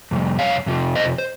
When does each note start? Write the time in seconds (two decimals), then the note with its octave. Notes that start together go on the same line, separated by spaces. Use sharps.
0.11 F2 C3 G3
0.39 C#5 F5
0.66 F2 C3 F3
0.95 C5 D#5
1.18 C5